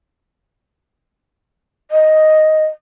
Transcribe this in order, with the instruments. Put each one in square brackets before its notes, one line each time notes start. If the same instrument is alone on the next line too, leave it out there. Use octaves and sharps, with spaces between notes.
[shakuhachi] D#5